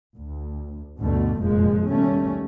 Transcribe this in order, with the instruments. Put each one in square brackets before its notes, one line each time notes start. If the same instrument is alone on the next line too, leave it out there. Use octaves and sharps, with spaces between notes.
[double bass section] D2
D2 G2 B2 D3 A3
F1 F#2 A#2 F3 G#3
D#2 B2 G3 A3 C#4